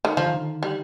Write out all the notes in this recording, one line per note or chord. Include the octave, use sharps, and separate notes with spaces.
D#3
D3 F3
D#3
D3
G3